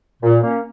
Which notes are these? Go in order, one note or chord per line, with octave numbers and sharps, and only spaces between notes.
A#2
A#3 C#4